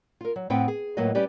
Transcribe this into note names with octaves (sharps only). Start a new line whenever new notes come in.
F4 A#4
F#3
A2 B3 C4 B4 F#5 G5
G#4
A2 F#3 A#3 F4 B4 D#5
G3 C#4 G4 B4 D5